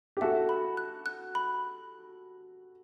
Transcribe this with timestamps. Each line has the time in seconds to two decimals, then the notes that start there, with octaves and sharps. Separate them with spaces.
0.17 G4
0.21 F#4 A4 E5
0.49 B5
0.77 F#6
1.06 F#6
1.35 B5